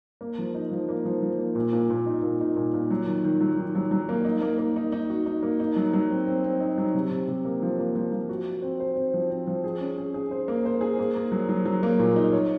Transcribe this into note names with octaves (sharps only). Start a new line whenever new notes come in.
A#3
F3
D#4
F3
A#3
F3
F3
A#3
A#2
A#2
A#2
D#4
A#2
D#4
A#2
A#2
F#3
D#3
D#3
F#3
D#3
F#3
F#3
A#3
D#4
A#3
A#3
D#4
D#4
F#4
D#4
A#3
D#4
F#3
F#3
C4
C4
C4
D#4
F#3
C3
C3
C3
A#3
F3
A#3
F3
F3
F#4
F#4
C4
C5
C4
F3
C4
F3
G#4
C#4
G#4
G#4
C5
A#3
C5
G#4
A#3
A#3
F#3
F#3
F#3
A#3
A#2
D#4
C#5